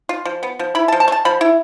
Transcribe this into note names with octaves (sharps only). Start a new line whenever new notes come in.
F4
F3
B3
F3
E4 B5
A5
F3
A5
A3
A5
F3 B5
E4